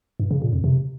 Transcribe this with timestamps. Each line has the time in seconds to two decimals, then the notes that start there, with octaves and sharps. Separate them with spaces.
0.20 G2
0.31 C#3
0.42 A#2
0.53 F2
0.64 C3